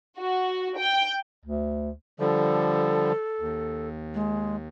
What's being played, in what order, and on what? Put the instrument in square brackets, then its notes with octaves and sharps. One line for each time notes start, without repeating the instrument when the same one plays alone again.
[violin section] F#4
G5
[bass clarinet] D2
[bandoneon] D3 F3 G3 [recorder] A4
[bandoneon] D#2
[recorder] G#3